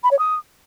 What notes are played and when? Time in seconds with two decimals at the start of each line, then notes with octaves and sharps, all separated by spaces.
0.03 B5
0.11 C#5
0.19 D#6